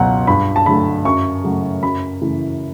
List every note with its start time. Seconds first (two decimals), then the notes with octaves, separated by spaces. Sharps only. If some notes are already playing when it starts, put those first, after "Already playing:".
Already playing: C#2 B2 F#3 F#5
0.27 G2 B5
0.56 A5
0.66 D3 F#3 A3 B5
1.05 F#2 C#6
1.44 C#3 F#3 A3
1.83 F#2 B5
2.22 C#3 E3 A3